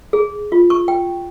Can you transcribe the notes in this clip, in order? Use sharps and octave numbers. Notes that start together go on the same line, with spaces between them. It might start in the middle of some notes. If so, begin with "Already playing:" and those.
G#4
F4
C#6
G5